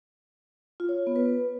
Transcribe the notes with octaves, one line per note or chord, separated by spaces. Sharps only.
F4
C#5
F4
B3
B4